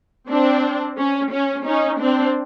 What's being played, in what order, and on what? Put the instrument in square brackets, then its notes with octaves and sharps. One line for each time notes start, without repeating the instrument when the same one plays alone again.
[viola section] C4 D4
C#4
C#4
C#4 D#4
C4 D4